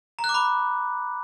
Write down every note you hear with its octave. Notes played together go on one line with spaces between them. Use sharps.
A#5
F#6
D6
B5